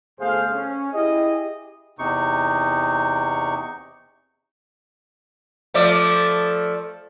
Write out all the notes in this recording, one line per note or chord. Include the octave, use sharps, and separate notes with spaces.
G1 A3 G#4 C5 F5
C#4
E4 G4 G#4 D#5
E2 C3 D#4 C#6
F3 A3 D5